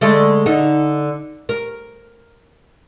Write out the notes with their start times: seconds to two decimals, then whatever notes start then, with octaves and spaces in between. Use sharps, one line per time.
0.01 D3 G#3 A3
0.46 D3 D#4
1.49 A#4